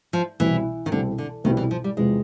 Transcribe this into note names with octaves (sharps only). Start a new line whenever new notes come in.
F3
C2 B2 E3 G3 C4 E4
D#3
C2 B2 D3 G3 C4 E4
D3
C2 B2 D#3 G3 C4 E4
E3
F3
G3
E2 C3 F3 G#3